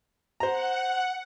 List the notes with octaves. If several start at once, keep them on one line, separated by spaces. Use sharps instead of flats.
C5 F#5 A#5